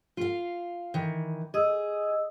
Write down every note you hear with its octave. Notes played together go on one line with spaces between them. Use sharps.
F4 F5
D#3 E3
G#4 D#5 D#6 E6